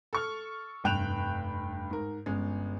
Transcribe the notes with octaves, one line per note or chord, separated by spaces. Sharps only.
A4 C#6 F6
F1 G2 G5 F#6 E7 F7
G#2 A#4
G1 G#3 C#4